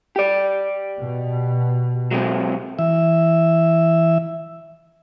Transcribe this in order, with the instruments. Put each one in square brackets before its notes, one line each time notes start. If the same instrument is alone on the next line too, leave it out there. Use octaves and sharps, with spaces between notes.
[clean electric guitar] G4 D5
[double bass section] B2
[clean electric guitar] F#3 G#3 C4
[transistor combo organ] E3 E5